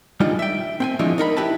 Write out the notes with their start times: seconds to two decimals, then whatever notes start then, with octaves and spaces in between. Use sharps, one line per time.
0.20 G3 G#3 D4 D#4 F4
0.39 E5 G5
0.80 C4 G5 G#5
0.99 F3 G#3 D4 E4 C#5
1.18 D#4 A#4 F#5 B5
1.37 E4 G4 B4 E5 A5